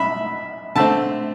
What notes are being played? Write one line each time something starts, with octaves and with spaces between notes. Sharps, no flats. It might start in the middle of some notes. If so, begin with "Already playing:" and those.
Already playing: E5 B5
D3 A3 C4 A5